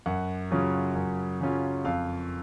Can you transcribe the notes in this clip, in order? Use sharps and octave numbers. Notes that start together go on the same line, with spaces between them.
F#2 F#5
C#3 F#3 C#4 F4
F#2
C#3 F#3 C#4 F4
F2 F5